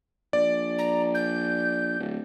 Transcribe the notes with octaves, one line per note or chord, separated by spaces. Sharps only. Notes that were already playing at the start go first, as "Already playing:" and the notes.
A#1 D5
A#5
G6
D1